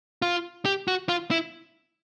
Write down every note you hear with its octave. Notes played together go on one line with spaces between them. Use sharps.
F4
G4
F#4
F4
E4